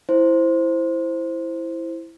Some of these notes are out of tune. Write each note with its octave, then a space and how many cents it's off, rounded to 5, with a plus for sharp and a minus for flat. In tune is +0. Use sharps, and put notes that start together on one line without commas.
E4 +5 C5 +0